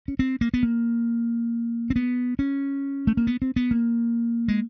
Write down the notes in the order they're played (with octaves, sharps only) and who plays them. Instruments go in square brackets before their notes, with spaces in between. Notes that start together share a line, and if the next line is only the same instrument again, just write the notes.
[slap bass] C#4
C4
A#3
B3
A#3
C4
B3
C#4
A3
A#3
B3
C4
B3
A#3
G#3